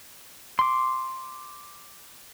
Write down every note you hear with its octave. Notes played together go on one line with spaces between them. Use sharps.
C6 D6